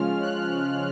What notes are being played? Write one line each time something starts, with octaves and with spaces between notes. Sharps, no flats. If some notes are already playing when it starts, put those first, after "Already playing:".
Already playing: C#3 F3 G#3 C#4 F4 F6
F#6